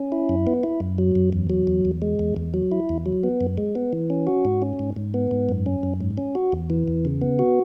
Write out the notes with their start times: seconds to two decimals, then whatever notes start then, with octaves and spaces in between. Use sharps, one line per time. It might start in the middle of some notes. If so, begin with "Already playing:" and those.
Already playing: C#4
0.12 E4
0.29 F#2
0.47 B3
0.63 E4
0.80 F#2
0.98 F#3
1.15 F#2
1.33 E2
1.50 F#3
1.67 E2
1.85 E2
2.02 G#3
2.19 E2
2.36 E2
2.54 F#3
2.72 E4
2.89 E2
3.06 F#3
3.23 B3
3.41 F#2
3.58 G#3
3.75 B3
3.93 E3
4.10 C#4
4.27 F#4
4.45 G#2
4.62 C#4
4.79 G#2
4.96 G#2
5.14 B3
5.31 G#2
5.49 F#2
5.66 C#4
5.83 F#2
6.01 G#2
6.17 C#4
6.35 F#4
6.52 E2
6.70 E3
6.88 E2
7.05 C#3
7.22 B3
7.39 F#4